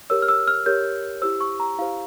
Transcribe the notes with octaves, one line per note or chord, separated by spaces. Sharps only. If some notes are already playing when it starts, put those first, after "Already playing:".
G4 A#4 C#5 E6
F6
E6
F6
G4 A#4 C#5 G6
E4 G4 C5 E6
C#6
A#5
E4 G4 C5 F5